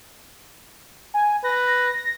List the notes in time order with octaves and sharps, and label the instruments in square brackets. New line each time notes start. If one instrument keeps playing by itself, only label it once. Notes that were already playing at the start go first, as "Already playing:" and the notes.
[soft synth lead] G#5
[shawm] B4 [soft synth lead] A#6